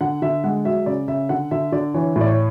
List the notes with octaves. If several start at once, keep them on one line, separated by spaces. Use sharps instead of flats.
D3 F#5
D3 E5
G#3 F#5
F#3 E5
C#3 D5
C#3 E5
D3 F#5
D3 E5
D3 D5
E3 C#5
A2 D5
C#5